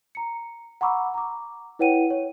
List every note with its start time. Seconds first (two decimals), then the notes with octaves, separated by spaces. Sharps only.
0.15 A#5 C#7
0.81 F#5 A#5 B5 C#6 D6 E6
1.14 A#5 D6
1.79 E4 B4 C#5 F#5 G5 D#7
2.10 C#5